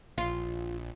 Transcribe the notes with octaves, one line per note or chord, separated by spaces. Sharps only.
A#1 F4